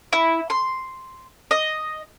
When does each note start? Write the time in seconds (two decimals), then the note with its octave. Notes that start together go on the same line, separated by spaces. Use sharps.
0.13 E4
0.50 C6
1.51 D#5